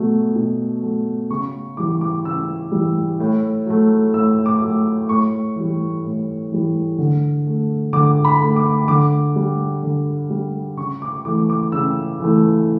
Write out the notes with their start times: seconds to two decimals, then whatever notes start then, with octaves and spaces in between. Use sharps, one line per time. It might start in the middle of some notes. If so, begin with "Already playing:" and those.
Already playing: B2 F#3 A3
0.36 B2
0.82 F#3 A3
1.30 C#3 C#6
1.77 E3 G3 D6
2.01 D6
2.25 C#3 E6
2.72 E3 G3
3.20 A2
3.67 F#3 A3
4.14 A2 E6
4.46 D6
4.62 F#3 A3
5.09 A2 C#6
5.56 E3 G3
6.04 A2
6.52 E3 G3
6.98 D3
7.46 A3
7.93 D3 D6
8.25 B5
8.40 A3
8.56 D6
8.88 D3 D6
9.36 G3
9.83 D3
10.30 G3
10.77 C#3 C#6
11.02 D6
11.25 E3 A3 D6
11.50 D6
11.72 C#3 E6
12.20 E3 A3